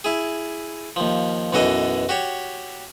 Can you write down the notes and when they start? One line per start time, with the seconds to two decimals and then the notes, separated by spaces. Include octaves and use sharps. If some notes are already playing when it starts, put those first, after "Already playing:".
0.04 E4 G#4
0.96 D#2 F3
1.53 B1 F#2 E3 F#4 A4 D#5
2.09 F#4 G4 C#5